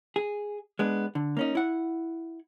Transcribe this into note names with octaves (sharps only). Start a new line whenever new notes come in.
G#4
G#3 B3 D4
D3
A#3 C#4 D#4
E4 F#5